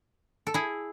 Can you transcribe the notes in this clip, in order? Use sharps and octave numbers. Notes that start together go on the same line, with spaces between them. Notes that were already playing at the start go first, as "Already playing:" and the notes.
A4
E4 G#4